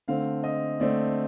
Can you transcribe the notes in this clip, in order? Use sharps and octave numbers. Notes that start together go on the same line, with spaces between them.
D3 A3 C4 F5
D#5
D3 A3 C4 D5